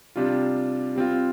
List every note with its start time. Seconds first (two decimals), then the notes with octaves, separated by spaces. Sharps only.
0.16 C3 G3 D4 F4
0.96 G3 C4 F4